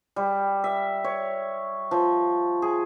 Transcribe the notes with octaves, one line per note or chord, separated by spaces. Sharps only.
G3
E5
C#5
F3
G#4